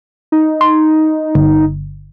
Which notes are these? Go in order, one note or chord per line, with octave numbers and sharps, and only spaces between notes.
D#4
C6
G1